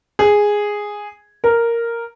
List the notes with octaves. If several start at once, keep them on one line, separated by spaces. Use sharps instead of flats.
G#4
A#4